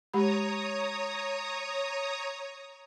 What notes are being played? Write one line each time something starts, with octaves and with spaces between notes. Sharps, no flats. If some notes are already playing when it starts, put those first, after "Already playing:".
G#3 G4 C#5 A#5 B5 D#6